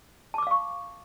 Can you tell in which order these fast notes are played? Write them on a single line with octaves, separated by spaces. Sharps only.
A5 D6 E6 F5 C#6